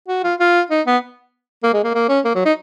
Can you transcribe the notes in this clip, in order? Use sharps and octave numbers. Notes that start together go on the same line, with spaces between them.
F#4
F4
F4
D#4
B3
A#3
G#3
A#3
A#3
C#4
A#3
F#3
D#4